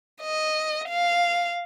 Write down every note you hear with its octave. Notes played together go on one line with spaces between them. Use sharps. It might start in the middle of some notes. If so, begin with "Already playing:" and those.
D#5
F5